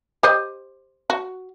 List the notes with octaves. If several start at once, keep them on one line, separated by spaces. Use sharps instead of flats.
G4 C5 D#5
F#4